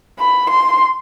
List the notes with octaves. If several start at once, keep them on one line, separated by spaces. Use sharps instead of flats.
B5
C6